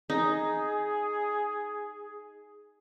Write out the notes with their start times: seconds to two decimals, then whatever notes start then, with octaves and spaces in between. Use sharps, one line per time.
0.10 D#4 G#4